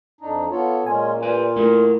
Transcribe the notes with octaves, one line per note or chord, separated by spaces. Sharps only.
F2 D4 D#4
B3 F4 A4 C#5
A#2 G#3 C#4 F4 G#5
F4 B4 D5
A3 E4 A#4